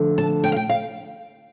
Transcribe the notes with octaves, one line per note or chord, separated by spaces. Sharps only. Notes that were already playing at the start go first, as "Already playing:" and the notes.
Already playing: D3 F3 A3
A5
G5
F5
G5
F5